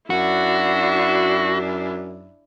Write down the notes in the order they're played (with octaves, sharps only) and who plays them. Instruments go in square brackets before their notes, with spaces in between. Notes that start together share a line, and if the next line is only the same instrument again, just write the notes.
[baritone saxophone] F#2 [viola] D4 E4 [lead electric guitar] F#4